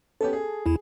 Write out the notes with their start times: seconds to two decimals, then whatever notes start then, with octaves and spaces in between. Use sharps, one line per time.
0.21 B3 C#4 G4 A4
0.33 G#4
0.66 E2 E4